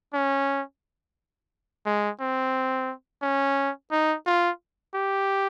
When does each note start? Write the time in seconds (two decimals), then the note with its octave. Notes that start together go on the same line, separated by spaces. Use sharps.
0.14 C#4
1.86 G#3
2.21 C4
3.22 C#4
3.91 D#4
4.26 F4
4.95 G4